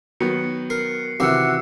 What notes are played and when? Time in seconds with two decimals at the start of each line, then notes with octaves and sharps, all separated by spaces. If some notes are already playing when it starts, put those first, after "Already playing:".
0.20 D#3 F#3 B3 C#7
0.70 A#4 C7
1.20 C3 D#3 E3 F#4 F#5 D6 E6 C#7